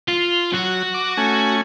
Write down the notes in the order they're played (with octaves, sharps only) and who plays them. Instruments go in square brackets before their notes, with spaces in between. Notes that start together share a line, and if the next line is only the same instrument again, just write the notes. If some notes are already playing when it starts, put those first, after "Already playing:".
[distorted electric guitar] F4
[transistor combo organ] F#3 [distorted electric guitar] F#4
[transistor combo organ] D6
A3 C#4 G#5